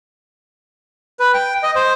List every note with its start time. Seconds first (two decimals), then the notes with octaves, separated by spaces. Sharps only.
1.20 B4
1.34 G5
1.63 D#5
1.75 C5